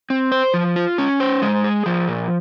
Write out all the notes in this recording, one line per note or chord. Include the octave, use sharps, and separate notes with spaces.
C4
C5
F3
F4
C#4
C5
G#3
G#4
F3
A#2